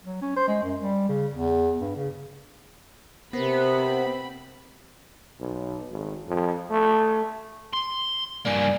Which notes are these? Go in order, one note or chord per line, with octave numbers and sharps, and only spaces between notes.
F#3
C#4
C5
G#3
F#2
G3
C#3
E2
G2
C#3
C3 B3 C4 A#4 C5 B5
B1
G#1
F2
A3
C6
G2 A#3 D5 G#5